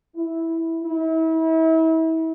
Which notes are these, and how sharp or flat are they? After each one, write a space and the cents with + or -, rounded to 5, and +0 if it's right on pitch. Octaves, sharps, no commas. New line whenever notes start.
E4 -10
E4 -35